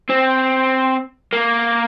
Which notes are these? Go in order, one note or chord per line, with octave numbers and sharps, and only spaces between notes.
C4
A#3